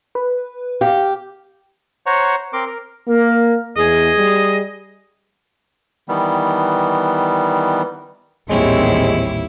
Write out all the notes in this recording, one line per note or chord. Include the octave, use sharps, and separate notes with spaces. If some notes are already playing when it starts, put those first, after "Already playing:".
B4
G4 F5
C5 C#5 F#5 A#5 C#6
C4 A#4 C6 D6
A#4
A#3 A#4
E2 G#4 D#5
G3
D#3 E3 G3 B3
A1 D#2 A#2 G3 G#3 C4 E4 C#5